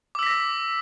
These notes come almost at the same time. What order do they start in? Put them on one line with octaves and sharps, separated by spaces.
D6 E6 B6 A#6